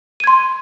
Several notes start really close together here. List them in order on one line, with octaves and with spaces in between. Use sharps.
D#7 G#6 C6